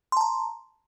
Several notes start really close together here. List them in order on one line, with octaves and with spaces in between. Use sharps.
C6 A5 A#5